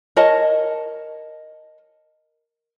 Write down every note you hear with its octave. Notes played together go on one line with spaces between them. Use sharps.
A#4 C#5 D#5 A5